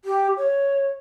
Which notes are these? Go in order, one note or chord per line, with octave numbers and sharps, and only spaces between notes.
G4
C#5